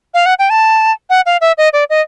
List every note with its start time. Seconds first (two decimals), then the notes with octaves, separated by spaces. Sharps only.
0.14 F5
0.26 F#5
0.39 G5
0.50 A5
1.10 F#5
1.26 F5
1.41 E5
1.58 D#5
1.73 D5
1.90 D#5